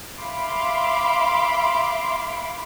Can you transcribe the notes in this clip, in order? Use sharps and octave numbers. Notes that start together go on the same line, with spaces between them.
E5 F5 B5 C6 D6